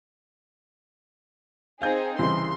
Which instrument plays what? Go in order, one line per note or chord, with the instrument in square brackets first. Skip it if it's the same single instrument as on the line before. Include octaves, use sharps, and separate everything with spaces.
[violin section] C4 D#4 G#4 [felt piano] F5 G6
[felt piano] C2 C#3 E3 [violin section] C6